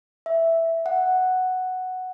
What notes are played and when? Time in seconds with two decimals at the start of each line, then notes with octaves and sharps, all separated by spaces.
0.26 E5
0.86 F#5